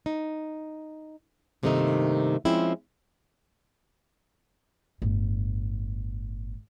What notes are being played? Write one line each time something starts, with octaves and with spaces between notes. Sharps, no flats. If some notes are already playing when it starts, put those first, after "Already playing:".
D#4
G2 C3 D#3 A3 A#3 D#4
F3 G#3 C4 C#4 E4
G1 A2